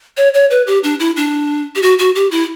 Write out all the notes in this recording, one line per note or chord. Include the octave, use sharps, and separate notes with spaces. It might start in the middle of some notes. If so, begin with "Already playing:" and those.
C#5
C#5
B4
G4
D4
E4
D4
G4
F#4
F#4
G4
E4